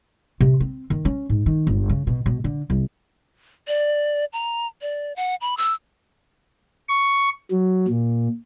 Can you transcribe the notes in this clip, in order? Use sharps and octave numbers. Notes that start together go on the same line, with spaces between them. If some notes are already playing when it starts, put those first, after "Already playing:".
C3
C4
D#3
C#4
G#2
D#3
G1
C#3
B2
B2
D3
C2
D5
A#5
D5
F#5
B5
E6
C#6
F#3
A#2